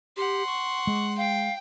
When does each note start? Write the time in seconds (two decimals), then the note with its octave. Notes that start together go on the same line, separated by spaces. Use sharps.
0.17 G4 F#5 C6
0.47 C#6
0.87 G#3
1.17 F5 G5